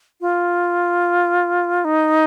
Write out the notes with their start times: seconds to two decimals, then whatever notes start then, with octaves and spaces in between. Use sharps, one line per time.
0.21 F4
1.85 D#4